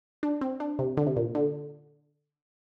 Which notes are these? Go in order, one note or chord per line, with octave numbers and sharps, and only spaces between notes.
D4
C4
D4
C3
D3
C3
A#2
D3